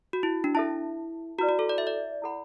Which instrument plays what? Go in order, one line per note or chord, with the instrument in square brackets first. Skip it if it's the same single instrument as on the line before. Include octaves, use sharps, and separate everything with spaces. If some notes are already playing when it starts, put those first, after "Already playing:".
[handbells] F#4
E4
D4
[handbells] E4 [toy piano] A4 E5 A5
[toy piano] E4 [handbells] F#4
[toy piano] B4 D5
[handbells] F#4
A4
D5
E5
D5
[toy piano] E4 A4 F#5 B5